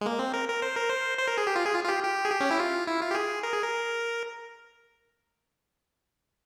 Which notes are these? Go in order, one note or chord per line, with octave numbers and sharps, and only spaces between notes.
G#3
A#3
C4
A#4
A#4
C5
A#4
C5
C5
A#4
G#4
G4
F4
G#4
F4
F4
G4
G4
G#4
G4
C#4
E4
F4
E4
F4
G4
G#4
A#4
G#4
A#4